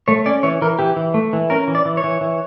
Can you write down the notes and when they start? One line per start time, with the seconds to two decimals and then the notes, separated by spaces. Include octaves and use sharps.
0.08 A3 C#5
0.26 C#4 D5
0.43 E3 C#5
0.62 E3 A#4
0.79 E3 G4
0.96 E3
1.14 A3
1.33 E3
1.50 C#4 A#4
1.68 E3
1.75 D5
1.85 E3
1.97 C#5
2.04 E3
2.21 E3